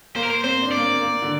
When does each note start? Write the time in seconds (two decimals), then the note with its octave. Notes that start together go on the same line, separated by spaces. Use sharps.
0.15 A#3 C5
0.23 A#4
0.31 C5
0.44 C4 C5
0.62 D4
0.72 D5
0.77 A#3
0.81 C4
1.00 A#3
1.22 D3